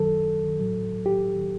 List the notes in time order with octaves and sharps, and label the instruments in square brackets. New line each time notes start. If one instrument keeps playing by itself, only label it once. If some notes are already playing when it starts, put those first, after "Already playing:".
Already playing: [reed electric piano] F#2 D#3 F#3 A4
A2 F#3
G4